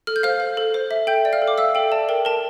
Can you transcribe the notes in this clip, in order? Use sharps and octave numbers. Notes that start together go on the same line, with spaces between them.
A4 F6
G6
C5 F5 F6
C5
A4
C5
E5
A4 G5 G6
D5
F5 F6
A4
D6
E5 F5 E6
A4 G5
D5 A5
A#4 G5
A#4 A5